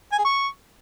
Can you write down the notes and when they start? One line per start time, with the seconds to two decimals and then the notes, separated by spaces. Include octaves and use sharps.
0.12 G#5
0.19 G#4
0.25 C#6